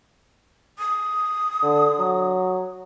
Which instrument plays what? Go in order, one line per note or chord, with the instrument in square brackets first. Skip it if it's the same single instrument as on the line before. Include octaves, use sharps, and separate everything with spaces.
[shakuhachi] D#6
[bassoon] D3
F#3